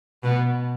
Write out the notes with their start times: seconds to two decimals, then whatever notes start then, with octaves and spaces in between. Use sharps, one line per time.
0.23 B2 B3